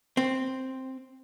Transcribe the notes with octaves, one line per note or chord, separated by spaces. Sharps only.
C4